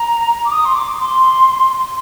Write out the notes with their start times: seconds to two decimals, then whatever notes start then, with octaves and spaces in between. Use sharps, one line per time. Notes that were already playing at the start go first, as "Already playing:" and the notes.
Already playing: A#5
0.45 D6
0.52 D#6
0.65 C6
0.75 D6
1.00 C6